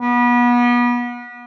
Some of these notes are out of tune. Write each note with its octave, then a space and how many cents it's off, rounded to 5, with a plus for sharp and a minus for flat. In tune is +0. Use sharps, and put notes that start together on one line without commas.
B3 -30